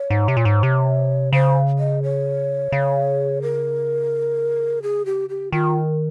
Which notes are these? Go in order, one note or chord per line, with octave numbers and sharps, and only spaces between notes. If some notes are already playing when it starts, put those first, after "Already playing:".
Already playing: C#5
G#2
C3
A#2
G#2
C3
C#3 C5
D#5
C#5
C#3
A#4
G#4
G4
G4
D#3 F4